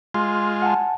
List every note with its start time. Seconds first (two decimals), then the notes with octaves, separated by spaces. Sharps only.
0.14 G#3 F4 C6
0.62 F#5 G#5 A5